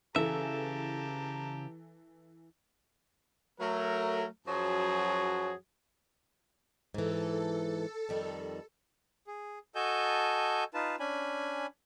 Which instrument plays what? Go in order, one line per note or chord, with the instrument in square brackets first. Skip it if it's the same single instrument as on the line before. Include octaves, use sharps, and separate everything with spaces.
[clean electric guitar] C#3 E5 [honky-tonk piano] E3 A4 [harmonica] G4 A5 A#5
[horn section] F#3 A3 A#4
F#2 F3 F#3 F#4 G#4 G#5
[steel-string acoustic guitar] G#2 E3 [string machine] A4
[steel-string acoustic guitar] F2 D#3 G3
[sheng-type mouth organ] G#4
F#4 A4 D#5 G#5 A5 G6
D#4 F4 B4 A5
C#4 D4 G#5 B5